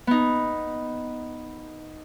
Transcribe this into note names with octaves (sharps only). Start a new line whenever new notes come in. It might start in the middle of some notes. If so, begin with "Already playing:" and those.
B3 D#4